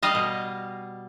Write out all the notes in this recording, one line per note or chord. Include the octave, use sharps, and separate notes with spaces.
G3 D#5 F5
B2